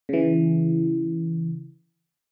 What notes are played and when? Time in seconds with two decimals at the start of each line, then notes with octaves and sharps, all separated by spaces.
0.09 C#3 E3